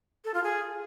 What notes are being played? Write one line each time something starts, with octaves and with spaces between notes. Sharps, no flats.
A4
F4
G#4